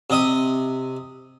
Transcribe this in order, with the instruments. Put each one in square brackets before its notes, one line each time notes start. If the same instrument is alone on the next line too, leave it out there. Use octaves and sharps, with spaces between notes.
[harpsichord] C3 D#5 D#6